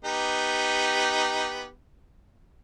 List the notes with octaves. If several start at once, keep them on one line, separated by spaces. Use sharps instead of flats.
B3 D#4 G4